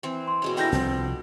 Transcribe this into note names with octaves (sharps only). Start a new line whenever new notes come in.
E3 C4
C6
B2 G#3 C#4
D4 E4 A4 G5 G6 A#6
C2 F3 C4